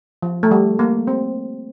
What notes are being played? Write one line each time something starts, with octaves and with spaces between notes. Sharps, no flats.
F3
A3
G3
A#3
C4